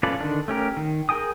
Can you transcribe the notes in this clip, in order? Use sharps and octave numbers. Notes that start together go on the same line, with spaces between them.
C#4 F4 A4 B4 D5
D3 D#3 D4
A3 C#4 G4 A#4
D#3
G#4 A#4 G5 G#5 D#6